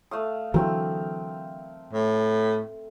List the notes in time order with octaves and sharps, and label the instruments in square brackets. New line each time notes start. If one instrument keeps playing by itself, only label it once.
[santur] A3 F5 D#6
[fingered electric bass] D3 E3 F#3 [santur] A3 C4 A#4
[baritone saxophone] A2